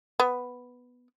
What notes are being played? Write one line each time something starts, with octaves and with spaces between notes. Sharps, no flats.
B3